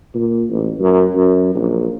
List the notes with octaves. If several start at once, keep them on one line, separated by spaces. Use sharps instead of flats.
A#2
A1
F#2
F#2
A#1